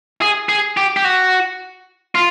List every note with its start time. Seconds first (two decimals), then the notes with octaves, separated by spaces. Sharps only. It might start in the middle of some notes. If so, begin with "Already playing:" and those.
0.22 G#4
0.49 G#4
0.77 G4
0.97 G4
1.05 F#4
2.15 F4